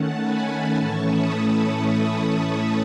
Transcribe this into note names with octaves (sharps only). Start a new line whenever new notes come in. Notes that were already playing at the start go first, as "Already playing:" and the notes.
Already playing: D#3 A3 C#4 F#5 A5
G#5 B5
A2 E3 A3 C#4 A5 C#6
B5 D#6